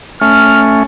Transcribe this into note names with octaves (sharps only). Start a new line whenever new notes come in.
A3 C#4 F6